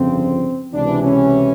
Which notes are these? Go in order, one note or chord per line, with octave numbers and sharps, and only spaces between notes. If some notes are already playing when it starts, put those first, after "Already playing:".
Already playing: G1 F2 C#3 F3 C4
C#2 C3 E3 D4
C#4